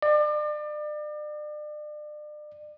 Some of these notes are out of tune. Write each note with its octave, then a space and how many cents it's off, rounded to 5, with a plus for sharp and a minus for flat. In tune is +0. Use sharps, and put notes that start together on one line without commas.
D5 +35